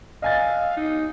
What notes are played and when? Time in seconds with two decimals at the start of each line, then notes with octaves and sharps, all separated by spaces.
0.22 D#5 F5 G#5 A6
0.77 D#4